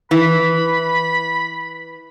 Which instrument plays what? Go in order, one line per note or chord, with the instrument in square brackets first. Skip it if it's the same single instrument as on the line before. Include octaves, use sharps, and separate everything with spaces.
[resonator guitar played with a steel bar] E3 [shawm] B5